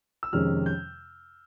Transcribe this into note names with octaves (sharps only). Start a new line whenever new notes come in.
E6
F2 C3 D#3 G#3 C#4 F6
G6